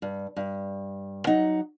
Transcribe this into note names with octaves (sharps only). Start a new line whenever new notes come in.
G2
G2
F#3 D#4 F#5